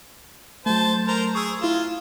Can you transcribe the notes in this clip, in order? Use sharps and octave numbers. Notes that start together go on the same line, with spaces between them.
F#3 A3 C5 A5
A#4 C5
G#4 C#6 E6
E4 F4 E7